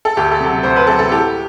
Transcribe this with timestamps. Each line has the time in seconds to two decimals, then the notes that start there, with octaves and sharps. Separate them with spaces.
0.05 A4
0.17 D2 G4
0.32 A4
0.40 C3 F#3
0.63 D2 C5
0.76 B4
0.87 C3 F#3 A4
0.99 A4
1.11 A2 G4